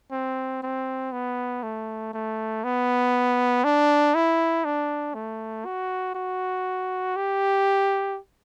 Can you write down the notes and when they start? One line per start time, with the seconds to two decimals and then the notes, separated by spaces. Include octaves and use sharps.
0.12 C4
0.63 C4
1.12 B3
1.63 A3
2.13 A3
2.64 B3
3.64 D4
4.15 E4
4.65 D4
5.14 A3
5.65 F#4
6.15 F#4
7.16 G4